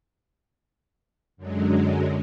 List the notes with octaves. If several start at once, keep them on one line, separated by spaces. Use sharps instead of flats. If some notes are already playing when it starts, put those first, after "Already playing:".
F#2 D3 F#3 G#3